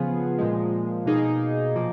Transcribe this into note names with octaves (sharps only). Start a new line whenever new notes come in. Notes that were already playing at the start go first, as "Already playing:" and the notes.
Already playing: C#3 F3 B3 F4 G#4
A#2 F3 G#3
B2 A#3 D#4 G#4
A#2 F3 A#3